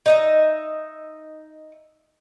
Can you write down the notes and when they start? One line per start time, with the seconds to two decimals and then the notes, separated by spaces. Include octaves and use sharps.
0.06 D#4 D#5 E5